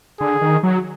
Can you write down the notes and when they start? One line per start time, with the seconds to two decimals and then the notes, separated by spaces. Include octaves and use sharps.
0.20 D3 G#4
0.42 D#3
0.63 F#3